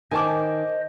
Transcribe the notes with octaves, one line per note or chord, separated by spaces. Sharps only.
D#3 C5 D#5 G#5 A5 D6